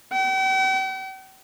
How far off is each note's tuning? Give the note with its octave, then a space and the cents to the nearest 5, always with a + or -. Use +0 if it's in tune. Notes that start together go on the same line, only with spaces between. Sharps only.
G5 -45